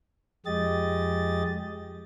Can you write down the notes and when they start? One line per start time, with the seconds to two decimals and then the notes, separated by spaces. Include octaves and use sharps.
0.46 F2 G#3 G4 D#5 A6